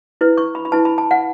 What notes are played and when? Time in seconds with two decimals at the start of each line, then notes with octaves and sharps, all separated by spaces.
0.21 E4 B4
0.37 C#6
0.55 B5
0.65 B5
0.72 E4 B4 A5
0.85 B5
0.98 A5
1.11 F#5